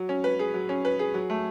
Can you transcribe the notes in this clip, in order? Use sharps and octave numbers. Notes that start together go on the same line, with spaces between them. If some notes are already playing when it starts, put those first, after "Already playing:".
Already playing: F#3
C#4
B4
G#4
F#3
C#4
B4
G#4
F#3
A3